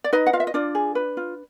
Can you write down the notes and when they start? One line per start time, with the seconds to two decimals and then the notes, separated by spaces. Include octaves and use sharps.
0.04 D5
0.13 D#4 B4 D#5
0.26 F#5
0.33 F4 F5
0.40 E5
0.47 D#5
0.54 D4 F4 D5
0.75 G#4
0.95 B4
1.17 F4